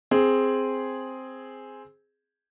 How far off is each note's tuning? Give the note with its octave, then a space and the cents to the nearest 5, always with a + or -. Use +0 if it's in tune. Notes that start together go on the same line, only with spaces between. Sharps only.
C4 +0 G#4 +0